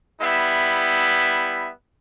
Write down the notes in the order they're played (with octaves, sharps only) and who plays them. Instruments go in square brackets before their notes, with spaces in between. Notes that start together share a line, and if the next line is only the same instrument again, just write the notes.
[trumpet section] G3 B3 E4 E5